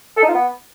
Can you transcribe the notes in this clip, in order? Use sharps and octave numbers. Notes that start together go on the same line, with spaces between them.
A4
D#4
F4
B3